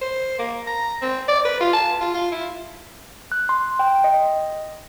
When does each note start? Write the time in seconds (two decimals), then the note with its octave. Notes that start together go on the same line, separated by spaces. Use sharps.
0.02 C5
0.39 A#3
0.67 A#5
1.02 C4
1.28 D5
1.45 B4
1.61 F4
1.73 A5
2.01 F4
2.14 F4
2.32 E4
3.32 F#6
3.49 C6
3.79 G5
4.04 D#5